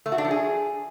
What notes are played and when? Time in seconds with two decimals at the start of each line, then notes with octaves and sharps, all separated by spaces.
0.06 A3
0.12 F#4
0.18 D4
0.24 F3
0.31 G#4